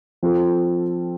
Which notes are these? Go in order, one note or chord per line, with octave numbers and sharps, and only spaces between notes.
F3 C4 F4 A4